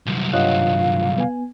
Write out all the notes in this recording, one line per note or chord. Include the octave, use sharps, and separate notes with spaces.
C2 F#2
G2 F4 C#5 D#5 F5 F#5 F#6
B3 G#5